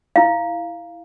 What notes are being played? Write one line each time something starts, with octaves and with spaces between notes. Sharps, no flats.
E4 F5